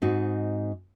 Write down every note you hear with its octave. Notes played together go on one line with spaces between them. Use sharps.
G#2 C4 D#4 F#4